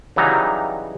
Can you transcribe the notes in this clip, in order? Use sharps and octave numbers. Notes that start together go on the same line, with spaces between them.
C#3 E3 F#3 G3 D#4 A#5